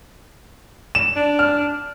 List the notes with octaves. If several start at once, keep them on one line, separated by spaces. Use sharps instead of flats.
E7
D4
F6